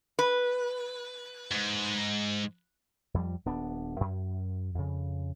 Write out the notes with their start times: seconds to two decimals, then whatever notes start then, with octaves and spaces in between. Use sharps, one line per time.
0.19 B4
1.52 G#2
3.14 F2 F3 G3
3.46 D#1 B3 D4
4.01 F#2
4.75 F2 C#3